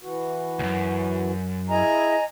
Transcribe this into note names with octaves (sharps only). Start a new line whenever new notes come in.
E3 F#4
C#2 F#2
E4 G#4 D#5 G#5 A#5